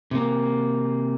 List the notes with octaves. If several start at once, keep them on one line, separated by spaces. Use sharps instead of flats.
C3 A#3